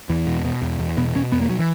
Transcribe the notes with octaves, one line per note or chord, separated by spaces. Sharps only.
E2 E3
B2
B2
E2
E2
B2 B3
B2 C#4
E2 B3
A#3
F#3
E3